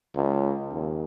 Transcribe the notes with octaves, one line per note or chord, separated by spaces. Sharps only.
C#2
D#2